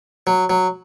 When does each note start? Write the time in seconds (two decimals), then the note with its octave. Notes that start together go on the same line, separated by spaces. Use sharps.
0.27 F#3
0.50 F#3